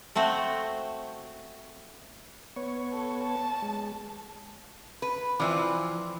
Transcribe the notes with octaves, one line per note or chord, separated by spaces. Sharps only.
A3 C4 F#4 C5
B3 C#5
A4
A5
G#3
B4
E3 F3 C4 D4